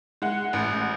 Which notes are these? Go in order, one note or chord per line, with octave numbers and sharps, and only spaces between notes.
G#3 F#5
A1